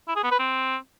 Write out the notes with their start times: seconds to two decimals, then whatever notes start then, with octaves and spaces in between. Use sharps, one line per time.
0.08 E4
0.16 G#4
0.24 B3
0.31 B4
0.39 C4